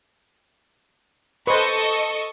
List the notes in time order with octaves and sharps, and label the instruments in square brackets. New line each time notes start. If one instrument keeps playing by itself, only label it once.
[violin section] A4 D#5 C#6 [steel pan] B4 C5